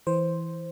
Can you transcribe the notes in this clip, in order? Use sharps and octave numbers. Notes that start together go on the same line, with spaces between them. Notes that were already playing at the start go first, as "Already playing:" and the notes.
E3 C5